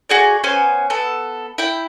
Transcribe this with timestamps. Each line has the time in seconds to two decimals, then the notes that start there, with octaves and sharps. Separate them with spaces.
0.09 F#4 G#4 D5
0.43 B3 C#4 C5 G#5
0.90 B3 A4
1.58 E4 G5